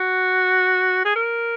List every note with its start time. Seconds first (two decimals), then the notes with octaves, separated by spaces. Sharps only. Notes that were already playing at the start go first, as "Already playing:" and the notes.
Already playing: F#4
1.05 G#4
1.16 A#4